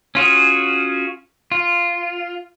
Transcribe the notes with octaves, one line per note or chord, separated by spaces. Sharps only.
C#4 F4 F#4 G#4
F4